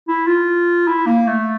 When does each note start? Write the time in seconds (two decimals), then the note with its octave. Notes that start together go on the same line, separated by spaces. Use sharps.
0.08 E4
0.27 F4
0.87 E4
1.07 A#3
1.27 A3